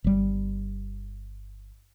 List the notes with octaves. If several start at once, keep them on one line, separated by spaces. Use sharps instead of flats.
G1 G3